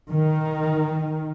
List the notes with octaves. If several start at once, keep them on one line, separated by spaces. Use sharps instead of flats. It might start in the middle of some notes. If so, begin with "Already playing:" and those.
D#3